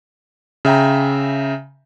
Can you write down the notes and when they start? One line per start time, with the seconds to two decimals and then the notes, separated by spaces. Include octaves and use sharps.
0.65 C#3 E5 G5 A#5